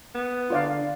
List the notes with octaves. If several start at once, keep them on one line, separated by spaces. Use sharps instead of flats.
B3
D3 F4 D5 F5